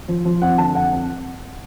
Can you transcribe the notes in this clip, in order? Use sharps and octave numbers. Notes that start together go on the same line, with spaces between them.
F3
F3
F2 F#5
D3 A5
F2 F#5
F2